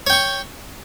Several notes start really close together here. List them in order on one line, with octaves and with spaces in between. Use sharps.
C#5 G5 C#6